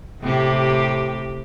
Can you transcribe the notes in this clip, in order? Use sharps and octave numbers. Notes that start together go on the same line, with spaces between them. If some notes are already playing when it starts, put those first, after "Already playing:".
A2 C3 G4